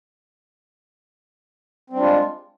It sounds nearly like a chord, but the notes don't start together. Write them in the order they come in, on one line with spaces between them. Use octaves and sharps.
C4 G3 D4 F4 G#3